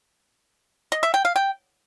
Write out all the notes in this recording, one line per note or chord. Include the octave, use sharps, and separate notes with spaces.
D#5
E5
G5
F5
G5